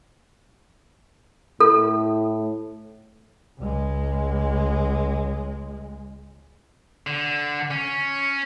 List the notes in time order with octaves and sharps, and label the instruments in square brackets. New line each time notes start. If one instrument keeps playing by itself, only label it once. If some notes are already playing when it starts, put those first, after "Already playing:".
[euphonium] A2 [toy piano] A4
[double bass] C#2 G#3
[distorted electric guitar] D3
C#4